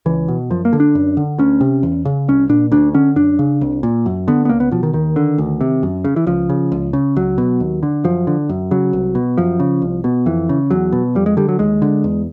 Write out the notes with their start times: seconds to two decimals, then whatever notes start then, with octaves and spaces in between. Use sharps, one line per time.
0.06 C#2 E3
0.28 B2
0.50 F#2 F3
0.65 A#3
0.73 D3
0.80 D4
0.95 F#2
1.17 D3
1.39 D2 C#4
1.61 C3
1.83 E2
2.05 C#3
2.28 C2 C#4
2.49 A#2 D4
2.72 D2 D4
2.94 D3 C#4
3.16 F#2 D4
3.39 C#3
3.61 C2
3.83 A#2
4.06 F#2
4.28 D3 B3
4.45 B3
4.49 C#2 A#3
4.60 B3
4.71 B2 F3
4.83 D#3
4.93 D#2 D#3
5.16 D3
5.38 D2
5.61 C3
5.83 F#2
6.04 C#3
6.16 E3
6.27 C#2 F3
6.49 C#3
6.72 C#2
6.93 C#3
7.16 C#2 F#3
7.38 B2
7.60 D#2
7.83 D3
8.04 F#2 F3
8.27 D3
8.49 F#2
8.71 C#3 F#3
8.93 C2
9.15 B2
9.38 F#2 F3
9.60 C#3
9.82 C2
10.04 B2
10.26 F2 E3
10.49 C#3
10.70 E2 F#3
10.92 B2
11.15 F2 G3
11.26 G#3
11.37 D3 G3
11.49 F#3
11.59 D#2 G#3
11.82 D3
12.04 E2